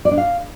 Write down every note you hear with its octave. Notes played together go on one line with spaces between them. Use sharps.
D5
D4
F5